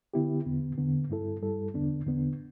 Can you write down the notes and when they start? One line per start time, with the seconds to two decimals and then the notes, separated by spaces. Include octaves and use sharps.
0.14 D3 B3 E4 G4
0.46 E2 D3 B3
0.78 E2 D3 B3
1.10 G2 G3 E4 A4
1.42 G2 G3 E4 A4
1.74 E2 D3 B3 D4
2.06 E2 D3 B3 D4